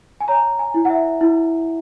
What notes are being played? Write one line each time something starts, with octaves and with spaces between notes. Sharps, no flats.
G#5
C#5 A#5
G#5
E4
F#5
E5
E4